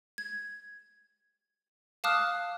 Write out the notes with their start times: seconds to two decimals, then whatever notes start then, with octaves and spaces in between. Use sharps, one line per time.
0.18 G#6
2.04 F5 A5 D6 D#6 F6 F#6